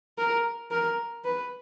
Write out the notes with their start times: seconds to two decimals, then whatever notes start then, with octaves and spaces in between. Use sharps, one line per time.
0.18 A#4
0.71 A#4
1.24 B4